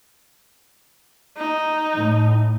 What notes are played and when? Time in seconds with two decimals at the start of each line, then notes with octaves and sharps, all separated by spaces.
1.37 D#4
1.92 A2